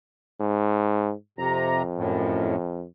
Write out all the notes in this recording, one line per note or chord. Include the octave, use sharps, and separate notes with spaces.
G#2
F2 C3 A#5
F#2 A2